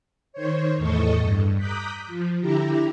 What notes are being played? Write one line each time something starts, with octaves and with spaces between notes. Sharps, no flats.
D#3 C5 C#5
E2 A2 A4 D#5 C#6
G2
A#5 D6 D#6 F#6 G6 B6
F3
D3 E4 G4 A#5